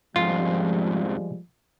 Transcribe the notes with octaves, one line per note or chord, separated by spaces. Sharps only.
F2 G#2 F3 G3 G#3 F4